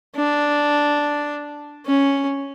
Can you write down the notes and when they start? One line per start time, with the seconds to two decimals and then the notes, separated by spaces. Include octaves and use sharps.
0.15 D4
1.86 C#4